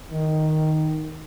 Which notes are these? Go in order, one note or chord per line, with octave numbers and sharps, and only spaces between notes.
D#3